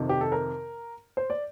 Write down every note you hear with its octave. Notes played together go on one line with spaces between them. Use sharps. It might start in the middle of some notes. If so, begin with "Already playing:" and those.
Already playing: F2 C3 D#3
G4
A4
A#4
C5
D5